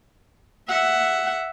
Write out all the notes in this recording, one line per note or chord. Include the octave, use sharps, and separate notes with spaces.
E5 F#5